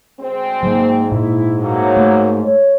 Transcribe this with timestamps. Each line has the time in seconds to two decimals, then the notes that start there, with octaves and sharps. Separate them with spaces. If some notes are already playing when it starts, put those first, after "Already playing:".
0.20 D2 G#3 C4
0.63 G#2 F#3 A#3
1.12 A#2 E4
1.59 A2 F#3 A#3
1.97 A3
2.44 C#5